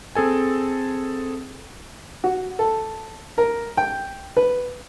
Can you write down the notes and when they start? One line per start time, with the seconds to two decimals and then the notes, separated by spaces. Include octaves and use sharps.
0.15 C4 G#4 A4 G#5
2.24 F#4
2.59 A4
3.38 A#4
3.77 G5
4.37 B4